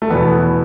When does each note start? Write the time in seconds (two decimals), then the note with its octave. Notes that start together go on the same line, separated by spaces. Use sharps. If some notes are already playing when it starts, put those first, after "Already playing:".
0.02 A3
0.10 E2 B2 B3